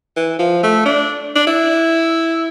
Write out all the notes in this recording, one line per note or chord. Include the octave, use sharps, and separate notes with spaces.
E3
F3
A3
D4
D4
E4